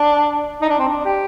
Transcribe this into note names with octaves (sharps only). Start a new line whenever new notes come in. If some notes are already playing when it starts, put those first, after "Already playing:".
Already playing: D4
D#4
D4
C4
D4
G4